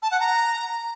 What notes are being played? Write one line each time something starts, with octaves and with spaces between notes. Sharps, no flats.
A5
F#5
A#5